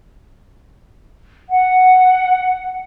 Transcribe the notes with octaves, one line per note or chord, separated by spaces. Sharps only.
F#5